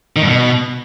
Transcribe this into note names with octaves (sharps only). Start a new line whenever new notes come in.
D#3
G2
B2